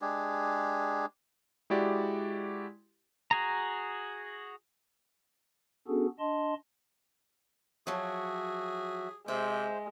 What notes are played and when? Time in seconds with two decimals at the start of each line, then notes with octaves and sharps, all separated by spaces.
0.01 G#3 D4 G4 G#4
1.70 G#3 E4 F#4 G4 D5
3.31 F#4 G#4 A#5
5.88 B3 C#4 D4 F#4 G#4 A4
6.19 D4 D#5 A5 C6
7.87 F3 F#3 F#4 G#4 E5
9.28 C3 G#3 C5 E5